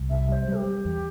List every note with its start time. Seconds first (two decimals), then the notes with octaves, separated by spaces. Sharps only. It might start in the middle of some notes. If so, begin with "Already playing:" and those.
Already playing: C2
0.10 C3 E5
0.29 G3 C5 E5
0.48 G3
0.57 G4
0.66 G3
0.85 E2